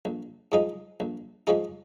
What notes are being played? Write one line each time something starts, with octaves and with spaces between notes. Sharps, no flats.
A#1
G#2 F3 G#3 D#4
A#1
G#2 F3 G#3 D#4